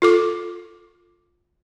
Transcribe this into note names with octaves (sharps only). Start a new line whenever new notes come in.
F4 A4 D6